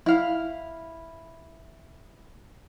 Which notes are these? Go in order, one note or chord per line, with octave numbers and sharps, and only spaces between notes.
E4 F5